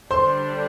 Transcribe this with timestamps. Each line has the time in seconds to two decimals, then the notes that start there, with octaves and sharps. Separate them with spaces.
0.10 D3 G3 D4 C5 C6